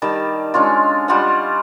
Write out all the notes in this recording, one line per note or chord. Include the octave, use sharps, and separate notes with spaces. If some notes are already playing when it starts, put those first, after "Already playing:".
D#3 G3 A5
G#3 C#4 D4 F4
G3 F4 D#5 F#5